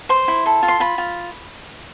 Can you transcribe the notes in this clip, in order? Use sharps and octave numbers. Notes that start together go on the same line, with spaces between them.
C5 C6
E4
A4
F4
C6
F4 B5
F4